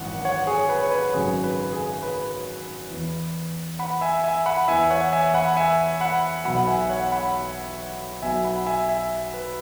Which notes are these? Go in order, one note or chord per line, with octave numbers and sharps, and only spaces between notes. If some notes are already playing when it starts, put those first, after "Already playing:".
Already playing: G#1 F#2 E3 F#5
C#5 F#5
G#4 C#5
B4
C#5
B4
G#1 F#2 C#3 F#3 G#4
B4
G#4
B4
E2 E3
F#5 B5
E5 G#5
E5 G#5
F#5 B5
E2 E3 E5 G#5
C#5 F#5
E5 G#5
F#5 B5
E5 G#5
F#5 B5
B1 B2 F#3 F#5 B5
F#5
E5 G#5
C#5 F#5
F#5 B5
B1 B2 F#3 E5 G#5
F#5 B5
E5 G#5
E5 G#5
B4